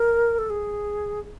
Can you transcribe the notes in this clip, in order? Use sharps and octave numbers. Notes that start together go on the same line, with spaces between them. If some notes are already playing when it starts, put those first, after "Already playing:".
Already playing: A#4
A4
G#4